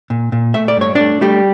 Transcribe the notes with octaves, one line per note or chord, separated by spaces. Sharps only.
A#2
A#2
A3 E5
D5
G2 C#5
A3 D4 D5
G3 A3 G4